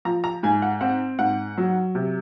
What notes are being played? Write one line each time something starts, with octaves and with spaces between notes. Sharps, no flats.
F3 A#5
A#5
G#2 G#5
F#5
C4 F#5
G#2 F#5
F#3
C3